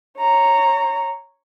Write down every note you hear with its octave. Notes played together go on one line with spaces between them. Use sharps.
C#5 A#5